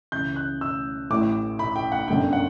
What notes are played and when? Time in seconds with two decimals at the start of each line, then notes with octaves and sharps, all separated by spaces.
0.12 C#2 C#3 E3 G6
0.36 F#6
0.61 E6
1.10 A1 A2 E3 D6
1.59 B5
1.76 G5
1.92 F#5
2.08 G1 F#2 D3 G5
2.33 F#5